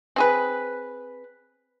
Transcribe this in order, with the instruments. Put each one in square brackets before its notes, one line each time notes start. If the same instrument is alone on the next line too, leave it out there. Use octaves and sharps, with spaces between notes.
[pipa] C4 G#4 B4